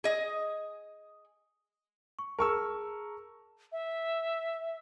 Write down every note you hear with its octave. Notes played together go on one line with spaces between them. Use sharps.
G#4 D#5
C#6
G#4 A#4 A5 C#6 E6
E5